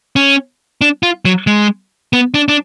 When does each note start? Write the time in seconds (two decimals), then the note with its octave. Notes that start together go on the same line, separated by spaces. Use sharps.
0.16 C#4
0.81 D4
1.03 F4
1.25 F#3
1.47 G#3
2.13 B3
2.34 D4
2.48 D4